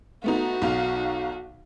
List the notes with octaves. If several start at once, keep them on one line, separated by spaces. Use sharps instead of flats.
A3 B3 D#4 F#4
B1 D#4 F5